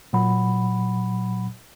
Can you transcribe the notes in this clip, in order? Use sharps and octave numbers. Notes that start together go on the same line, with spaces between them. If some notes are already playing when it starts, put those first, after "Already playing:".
A#2 F#3 F#5 B5